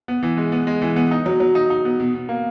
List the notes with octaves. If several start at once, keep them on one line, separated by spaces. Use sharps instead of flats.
B3
E3
G#3
B3
G#3
E3
B3
D#4
F#3
F#3
D#4
D#4
B3
B2
B2
A#3